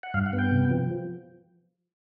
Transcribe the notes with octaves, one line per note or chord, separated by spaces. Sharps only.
F#5
G2 F5
F#5
B3
G5
C3
F3